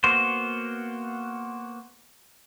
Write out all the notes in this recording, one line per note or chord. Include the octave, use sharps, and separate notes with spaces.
A#3 B3 F#4 C5